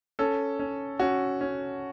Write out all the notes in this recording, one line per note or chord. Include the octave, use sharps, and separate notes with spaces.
C#4 A4
C#4
C#4 F#4
C#4